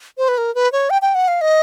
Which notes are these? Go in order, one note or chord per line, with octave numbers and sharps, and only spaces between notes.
C5
B4
A#4
B4
C#5
G5
G5
F#5
F5
D#5